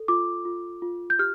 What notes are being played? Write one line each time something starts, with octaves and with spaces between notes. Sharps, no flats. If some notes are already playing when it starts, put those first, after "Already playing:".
Already playing: A4
F4 D6
F4
F4
G6
G4 F6